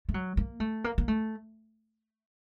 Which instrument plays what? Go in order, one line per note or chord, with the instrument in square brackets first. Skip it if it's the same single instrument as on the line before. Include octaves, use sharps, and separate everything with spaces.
[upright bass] A3
F#3
A#3
A3
A#3
A#3
A3